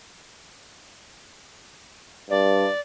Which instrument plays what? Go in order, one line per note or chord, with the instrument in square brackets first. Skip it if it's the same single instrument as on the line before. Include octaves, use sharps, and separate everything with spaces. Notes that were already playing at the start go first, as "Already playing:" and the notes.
[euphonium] G2 [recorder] D5